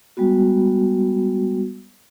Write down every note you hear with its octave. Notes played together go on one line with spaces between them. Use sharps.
G3 G#3 B3 F#4